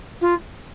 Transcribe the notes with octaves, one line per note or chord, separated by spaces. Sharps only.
F4